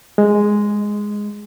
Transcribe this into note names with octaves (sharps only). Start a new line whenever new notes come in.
G#3